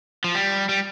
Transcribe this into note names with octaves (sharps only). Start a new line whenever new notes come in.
F3
G3
G3